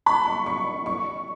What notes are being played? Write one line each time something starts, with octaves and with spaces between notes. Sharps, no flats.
B5
C#6
C#6
C#6